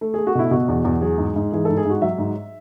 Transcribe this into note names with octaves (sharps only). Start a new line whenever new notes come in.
A3
A3 G#4
F#4
B2 E4
B2 F#4
E2
E2
F#3 G#4
G#2
G#2
E3 G#4
G#2 A4
G#4
G#2 F#4
F#3 E5
G#2